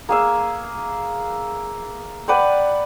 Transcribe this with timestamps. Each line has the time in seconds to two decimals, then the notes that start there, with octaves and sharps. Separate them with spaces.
0.09 A#3 G#4 E5
2.28 B4 D5 F#5 G5